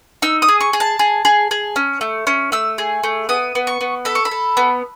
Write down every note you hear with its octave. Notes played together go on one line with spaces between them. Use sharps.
D#4 E6
D#6
G#4
C#6
G#4
A5
G#4
G#4
G#4
C#4
A3
C#4
A3 E6
G#4
A3
B3 D#6
B3
C#6
B3
A4 B5
C#6
B5
A4
B3